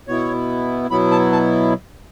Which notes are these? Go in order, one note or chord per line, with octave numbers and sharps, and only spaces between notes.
B2 B3 E4 C#5
B2 F#3 B3 E4 B5
A5
A5